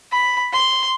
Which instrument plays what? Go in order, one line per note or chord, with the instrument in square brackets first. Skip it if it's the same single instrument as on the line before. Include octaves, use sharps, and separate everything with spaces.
[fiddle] B5
C6